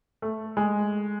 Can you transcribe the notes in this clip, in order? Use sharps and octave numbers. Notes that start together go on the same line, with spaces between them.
A3
G#3